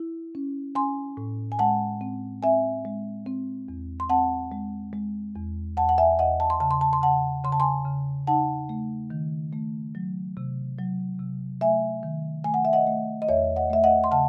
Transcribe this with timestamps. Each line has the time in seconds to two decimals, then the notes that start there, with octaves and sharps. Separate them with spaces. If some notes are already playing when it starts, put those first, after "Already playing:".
Already playing: E4
0.35 C#4
0.75 C#4 G#5 C6
1.17 A2
1.52 G#5
1.59 G#3 F#5 A5
2.01 C4
2.43 C4 E5 G#5
2.85 G#3
3.26 C4
3.68 E2
4.00 C6
4.10 C4 F#5 A5
4.52 G#3
4.93 G#3
5.35 E2
5.77 E2 F#5 A5
5.89 F#5
5.98 E5 G#5
6.19 E2 D#5 F#5
6.40 A5
6.50 C6
6.60 C#3 A5
6.71 C6
6.81 A5
6.93 C6
7.02 C#3 F#5 A5
7.44 C#3 C6
7.52 A5
7.60 G#5 C6
7.85 C#3
8.27 D#4 F#5 A5
8.69 A3
9.10 D#3
9.53 A3
9.95 F#3
10.37 C3
10.78 F#3
11.20 C3
11.61 A3 E5 G#5
12.03 D#3
12.44 A3 G#5
12.54 F#5
12.65 E5
12.73 D#5 F#5
12.87 A3
13.22 D#5
13.29 E2 C#5 E5
13.56 D#5 F#5
13.70 A3 E5
13.84 D#5 F#5
14.04 C6
14.11 C#3 F#5 A5